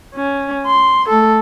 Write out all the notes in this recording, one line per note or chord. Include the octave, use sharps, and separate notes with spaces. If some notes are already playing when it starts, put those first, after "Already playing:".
C#4
C6
A3 A4